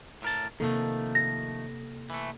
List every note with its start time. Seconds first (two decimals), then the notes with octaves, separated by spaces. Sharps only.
0.22 A2 A#4 A5
0.60 C3 D#3 F3 A3 A#3 A4
1.15 A#6
2.10 E3 A3